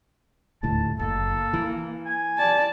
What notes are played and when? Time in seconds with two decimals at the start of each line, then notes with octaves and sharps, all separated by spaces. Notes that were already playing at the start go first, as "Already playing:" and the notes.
0.63 D#1 D2 A2 A5
0.99 F#1 A#3 A4
1.53 E3
2.06 G#5
2.38 D5 A5